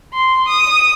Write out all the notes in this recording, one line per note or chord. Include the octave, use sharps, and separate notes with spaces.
C6
D#6